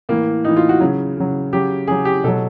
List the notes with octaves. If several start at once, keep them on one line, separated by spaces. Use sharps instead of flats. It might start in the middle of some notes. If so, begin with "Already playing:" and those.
A2 E3 A#3
A2 E3 D#4
F4
F#4
C#3 F#3
C#3 F#3
C#3 F#3 G4
C#3 F#3 G#4
G4
B2 F#3 A4